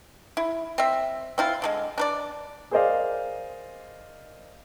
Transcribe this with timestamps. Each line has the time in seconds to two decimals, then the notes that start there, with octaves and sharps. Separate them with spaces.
0.37 E4
0.78 C4 E5
1.38 C4 E4 F4
1.62 D3 F3 G#3
1.98 D4 B4 D5
2.71 G#4 A#4 C5 D5 D#5 F5